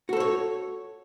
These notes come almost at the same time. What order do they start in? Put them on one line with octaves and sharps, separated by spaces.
F#4 A4 C5 C#5